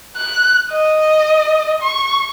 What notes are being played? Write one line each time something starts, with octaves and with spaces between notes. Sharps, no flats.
F#6
D#5
C#6